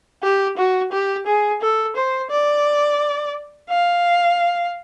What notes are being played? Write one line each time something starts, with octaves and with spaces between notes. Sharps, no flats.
G4
F#4
G4
G#4
A4
C5
D5
F5